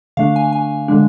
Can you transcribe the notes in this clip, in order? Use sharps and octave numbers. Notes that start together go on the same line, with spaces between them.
D3 A3 D4 F5
G#5
G#5
D3 G#3 D4